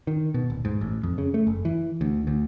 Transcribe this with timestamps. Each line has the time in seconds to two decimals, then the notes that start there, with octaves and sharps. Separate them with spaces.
0.07 D#3
0.34 B2
0.50 D1
0.65 G#2
0.81 A1
1.03 F2
1.18 C#3
1.34 A3
1.47 F#1
1.65 E3
2.01 D2
2.27 D2